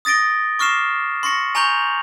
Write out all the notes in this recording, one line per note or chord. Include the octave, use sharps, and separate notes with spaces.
D#6 A6 A#6 D7 G7
C#6 D6 F6 A#6 C7 E7
C6 C#6 A#6 C#7 F#7
G#5 A#5 C#6 G6 F7 F#7